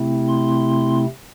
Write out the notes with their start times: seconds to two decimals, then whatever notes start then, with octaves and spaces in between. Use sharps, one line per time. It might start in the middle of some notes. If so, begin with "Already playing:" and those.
Already playing: C3 A3 C4 E4
0.28 C6